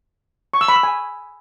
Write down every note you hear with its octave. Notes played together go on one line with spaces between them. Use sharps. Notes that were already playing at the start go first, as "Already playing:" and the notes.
C#6
E6
B5
E6
G#5